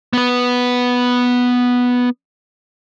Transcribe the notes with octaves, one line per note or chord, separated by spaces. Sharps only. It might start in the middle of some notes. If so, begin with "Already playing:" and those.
B3 B4